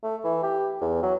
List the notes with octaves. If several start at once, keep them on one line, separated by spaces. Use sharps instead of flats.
A3
E3
G4
E2
F#3